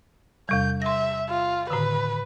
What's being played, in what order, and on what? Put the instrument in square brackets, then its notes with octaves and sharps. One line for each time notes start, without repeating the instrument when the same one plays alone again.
[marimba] E2 C3 G3 [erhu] G6
[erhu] E5 [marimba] C6 A#6
[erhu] F4
[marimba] A2 D3 D#3 [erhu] B4